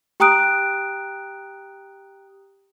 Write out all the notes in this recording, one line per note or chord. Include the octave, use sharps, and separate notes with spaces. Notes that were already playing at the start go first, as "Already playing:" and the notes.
G4 G5 A#5 D#6 F#6 D7